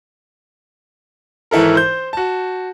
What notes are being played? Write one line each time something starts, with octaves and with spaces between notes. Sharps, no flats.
G#1 E3 E4 A4 A#4
C5 G6
F#4 A5